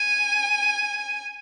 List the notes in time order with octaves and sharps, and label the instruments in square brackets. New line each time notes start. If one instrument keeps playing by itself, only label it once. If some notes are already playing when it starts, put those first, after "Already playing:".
Already playing: [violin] G#5